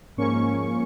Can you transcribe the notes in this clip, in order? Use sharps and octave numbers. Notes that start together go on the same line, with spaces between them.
G#2 F3 A#3 C#4 C#6